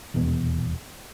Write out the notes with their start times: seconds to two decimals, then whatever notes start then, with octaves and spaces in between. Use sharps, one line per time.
0.14 D#1 E2 B2 B3